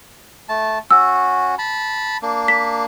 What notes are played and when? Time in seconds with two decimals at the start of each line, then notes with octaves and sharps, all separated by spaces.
0.49 A3 A5
0.91 C#4 F#4 E6
1.58 A5 B5
2.22 A#3 D4
2.48 B6